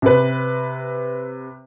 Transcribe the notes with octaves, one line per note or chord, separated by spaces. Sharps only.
C3 B4